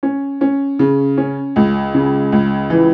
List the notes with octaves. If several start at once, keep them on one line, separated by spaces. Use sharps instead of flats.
C#4
C#4
C#3
C#4
C#2
C#3
C#2
E3